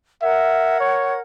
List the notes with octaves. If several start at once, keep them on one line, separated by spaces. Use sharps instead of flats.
A#4 E5 F#5 G#6
C#5